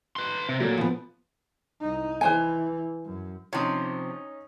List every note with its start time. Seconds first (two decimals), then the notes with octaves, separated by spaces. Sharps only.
0.16 B4 C6
0.49 C3
0.60 A#2 F#3 A3
0.78 F3 B3
1.81 C2 D#4
2.21 E3 B4 C5 G#5
3.05 F#2
3.53 C3 F3 C#4 D#4